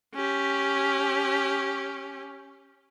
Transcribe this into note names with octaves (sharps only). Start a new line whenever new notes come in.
C#4 G4